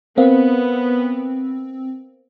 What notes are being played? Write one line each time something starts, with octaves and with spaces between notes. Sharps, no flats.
B3 C4 A#4 C5 F5